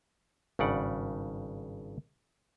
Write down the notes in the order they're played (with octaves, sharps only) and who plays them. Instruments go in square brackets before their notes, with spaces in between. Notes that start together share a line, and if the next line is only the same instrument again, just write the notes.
[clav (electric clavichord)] G#1 G2 C#3 D5 F#5